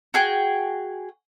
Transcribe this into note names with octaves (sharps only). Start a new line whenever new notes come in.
F#4 G#4 G5